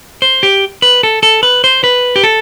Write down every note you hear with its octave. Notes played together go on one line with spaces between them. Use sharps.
C5
G4
B4
A4
A4
B4
C5
B4
G4
A4